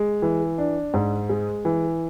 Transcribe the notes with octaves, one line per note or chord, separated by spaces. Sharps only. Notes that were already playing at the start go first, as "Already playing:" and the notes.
Already playing: G#3
E3
D4
G#2
G#3
E3